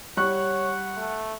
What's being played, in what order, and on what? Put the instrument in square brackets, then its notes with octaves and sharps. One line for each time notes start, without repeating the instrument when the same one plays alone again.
[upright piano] G3 C#6 F#6 [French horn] C#5 [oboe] F#5
[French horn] A3